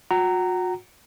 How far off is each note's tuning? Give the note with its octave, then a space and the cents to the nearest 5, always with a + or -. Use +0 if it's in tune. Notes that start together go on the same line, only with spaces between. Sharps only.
F#4 -40 F#5 +35 A#5 -10